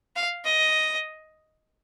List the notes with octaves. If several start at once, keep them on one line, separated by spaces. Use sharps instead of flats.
F5
D#5